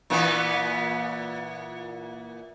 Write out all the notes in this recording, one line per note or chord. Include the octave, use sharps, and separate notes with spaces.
A#2 E3 B3